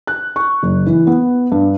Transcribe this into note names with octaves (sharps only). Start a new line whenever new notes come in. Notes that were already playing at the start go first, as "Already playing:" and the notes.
F#6
C#6
F#1
E3
B3
G2